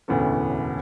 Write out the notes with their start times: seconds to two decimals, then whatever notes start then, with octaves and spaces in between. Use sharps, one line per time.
0.08 E1 D2 A2 B3 C#4 A4